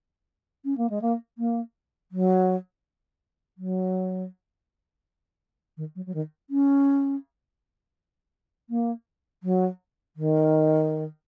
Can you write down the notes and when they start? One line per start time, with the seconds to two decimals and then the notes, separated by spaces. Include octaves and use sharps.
0.65 C#4
0.77 A#3
0.90 G#3
1.02 A#3
1.38 A#3
2.11 F#3
3.57 F#3
5.77 D#3
5.95 F#3
6.06 F#3
6.14 D#3
6.50 C#4
8.70 A#3
9.43 F#3
10.16 D#3